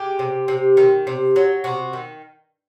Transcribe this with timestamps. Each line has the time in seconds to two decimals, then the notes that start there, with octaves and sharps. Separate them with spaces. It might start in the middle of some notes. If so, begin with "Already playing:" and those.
Already playing: G#3 G4
0.19 C3
0.48 C3
0.77 D#3
1.07 C3
1.36 F#3
1.64 C3 F#4
1.93 D#3